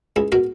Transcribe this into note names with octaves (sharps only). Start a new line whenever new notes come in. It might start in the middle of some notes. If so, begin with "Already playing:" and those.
C#2 E4 G#4
B2 F#4 A#4